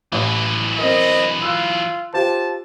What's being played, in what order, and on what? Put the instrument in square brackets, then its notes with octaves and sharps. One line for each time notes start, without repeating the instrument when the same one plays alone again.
[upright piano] A1 C#5 [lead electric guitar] E3 F#3
[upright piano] C4 A#4 [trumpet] D#5
[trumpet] F4 [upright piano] E6 F#6
[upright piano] F4 G4 C5 [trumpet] A5